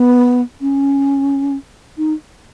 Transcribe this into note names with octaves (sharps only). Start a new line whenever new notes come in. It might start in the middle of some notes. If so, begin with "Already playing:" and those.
Already playing: B3
C#4
D#4